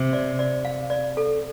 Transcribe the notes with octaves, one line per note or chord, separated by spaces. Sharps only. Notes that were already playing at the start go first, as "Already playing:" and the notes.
Already playing: C3
D5
D5
F5
D5
A4